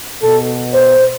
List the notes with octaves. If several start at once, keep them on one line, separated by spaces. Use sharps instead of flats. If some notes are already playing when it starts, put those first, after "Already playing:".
B2 A4
C5